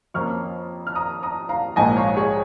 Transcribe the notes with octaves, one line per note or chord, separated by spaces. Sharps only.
F2 F3 A#3 C#4 C#6 F6
F6
A#5 D#6
A#5 D#6
F5 A#5
A#1 G#2 F3 A#3 D#5 G#5
C#5 F5
G#4 C#5